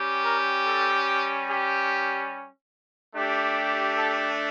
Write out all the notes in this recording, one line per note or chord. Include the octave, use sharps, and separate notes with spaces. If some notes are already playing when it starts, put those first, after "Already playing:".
Already playing: G3 C#4 G4
A#4
A4
G4
A3 D4 G4
A4